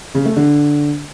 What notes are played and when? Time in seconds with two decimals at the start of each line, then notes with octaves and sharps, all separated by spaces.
0.15 C#3
0.26 A3
0.36 D3